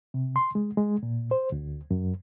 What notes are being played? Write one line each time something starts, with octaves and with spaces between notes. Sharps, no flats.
C3
C6
G#3
G#3
A#2
C5
D2
F#2